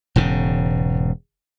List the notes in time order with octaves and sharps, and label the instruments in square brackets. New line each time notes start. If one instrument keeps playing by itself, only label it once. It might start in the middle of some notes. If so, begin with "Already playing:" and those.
[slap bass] E1 G#2 C#3